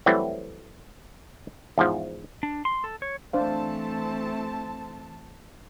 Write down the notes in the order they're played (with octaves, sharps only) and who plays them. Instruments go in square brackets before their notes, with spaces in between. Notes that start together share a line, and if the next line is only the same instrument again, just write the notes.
[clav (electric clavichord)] E3 F#3 G3 A3 C4 E4
E2 G#2 F3
[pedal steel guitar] D4
C6
A4
C#5
[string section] E3 A5 [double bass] A3 C4 [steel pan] D4 C5 F5